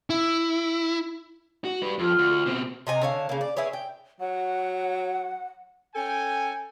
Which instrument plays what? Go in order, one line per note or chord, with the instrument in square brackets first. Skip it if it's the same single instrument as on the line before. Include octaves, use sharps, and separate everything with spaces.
[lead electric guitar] E4
F#4
G3 B4
[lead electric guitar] F2 [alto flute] F4
[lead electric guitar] D2
B2 C4
[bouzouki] C3 D#5 G#5 A#5
D3 C#5 F5
C#3 A#3
D5
E4 G#4 B4 C#5
G5
[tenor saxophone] F#3 [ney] F#5
[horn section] C#4 A4 G5 G#5